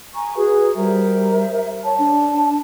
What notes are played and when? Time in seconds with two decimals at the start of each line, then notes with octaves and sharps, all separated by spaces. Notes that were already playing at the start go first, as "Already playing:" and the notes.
0.14 G#5 A#5 C#6
0.36 F#4 G#4 B4
0.76 G3 A#4 C5 E5
1.85 C#5 A5
1.98 D4